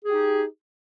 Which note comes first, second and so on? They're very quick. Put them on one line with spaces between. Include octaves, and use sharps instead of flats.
G#4 G4 D#4